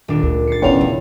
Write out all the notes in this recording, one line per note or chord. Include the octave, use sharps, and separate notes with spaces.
D#1 D4
D2 A#4
A6 C7 C#7
E2 E3 C#4 C#5 D5 F5 G5 C#7
E3